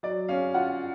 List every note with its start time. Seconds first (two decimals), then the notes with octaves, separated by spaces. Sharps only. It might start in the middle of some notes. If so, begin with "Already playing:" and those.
0.03 F#3 D5
0.28 C#4 F5
0.54 F4 F#5